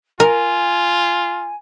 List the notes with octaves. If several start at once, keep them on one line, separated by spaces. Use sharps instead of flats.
F4 A#4 G#5